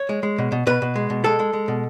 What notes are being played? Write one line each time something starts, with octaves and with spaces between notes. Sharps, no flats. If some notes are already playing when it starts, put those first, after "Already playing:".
Already playing: C#5
G#3
G#3
B2
B2
B2 B4
B2
G#3
B2
G#3 A4
G#3
G#3
B2